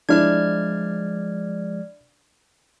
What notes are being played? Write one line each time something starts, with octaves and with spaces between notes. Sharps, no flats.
F3 G#3 D4 E4 D5 F6 G#6